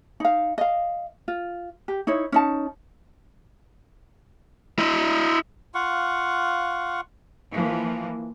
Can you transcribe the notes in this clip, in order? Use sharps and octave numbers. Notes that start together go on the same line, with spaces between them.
D#4 F5
D#5 F5
F4
G4
D#4 E4 C#5
C#4 D#4 A5
E4 D#5
F4 F5 F#5 C#6
E3 F3 A#3